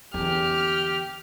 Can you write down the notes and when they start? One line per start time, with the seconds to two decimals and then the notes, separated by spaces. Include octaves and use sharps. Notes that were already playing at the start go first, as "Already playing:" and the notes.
0.14 E2 D3 G4 F6